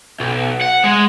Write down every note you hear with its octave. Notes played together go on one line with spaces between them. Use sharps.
B1
F#5
G#3